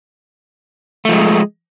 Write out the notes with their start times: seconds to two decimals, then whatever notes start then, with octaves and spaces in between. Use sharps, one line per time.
1.05 A3
1.09 F3
1.13 G#3